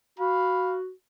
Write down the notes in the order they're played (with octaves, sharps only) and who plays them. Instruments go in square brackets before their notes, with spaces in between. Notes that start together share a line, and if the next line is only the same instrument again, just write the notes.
[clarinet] F#4 [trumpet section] F5 B5